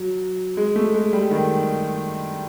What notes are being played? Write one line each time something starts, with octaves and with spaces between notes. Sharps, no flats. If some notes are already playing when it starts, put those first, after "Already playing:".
Already playing: F#3
G#3
A3
G#3
G3
D#3